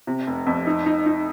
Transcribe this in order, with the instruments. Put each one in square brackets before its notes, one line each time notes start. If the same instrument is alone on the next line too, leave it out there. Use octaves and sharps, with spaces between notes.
[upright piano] C3
F1
F2
D#4
D#4
D#4